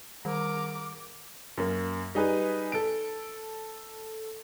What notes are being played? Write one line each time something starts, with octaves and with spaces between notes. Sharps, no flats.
D#3 G3 A#4 D6
F#2 A#3
G3 D#4 G#4 B4
A4 D7